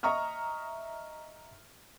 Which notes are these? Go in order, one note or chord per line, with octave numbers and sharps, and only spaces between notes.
D#5 E5 A#5 C#6 D#6 F6